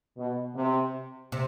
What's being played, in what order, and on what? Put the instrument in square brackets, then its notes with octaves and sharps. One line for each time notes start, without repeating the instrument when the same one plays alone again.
[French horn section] B2
C3
[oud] C3